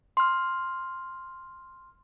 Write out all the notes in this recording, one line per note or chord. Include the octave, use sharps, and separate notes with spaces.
C6 F6